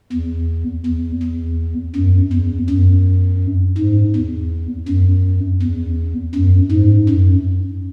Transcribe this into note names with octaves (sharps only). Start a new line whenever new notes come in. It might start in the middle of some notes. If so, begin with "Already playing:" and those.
E2
E2
E2
F#2
E2
F#2
G#2
E2
F#2
E2
F#2
G#2
F#2